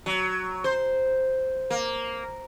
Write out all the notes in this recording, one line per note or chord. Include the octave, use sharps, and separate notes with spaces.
F#3
C5
A#3